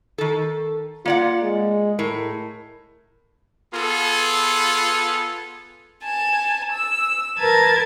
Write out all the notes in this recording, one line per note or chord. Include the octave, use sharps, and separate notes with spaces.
D#3 A4
A#3 F4 D5 F#5
G#3
A2 A#4
B3 F4 G#4 A4
G#5 A5
E6
A#4 B4 A5 G#6 A6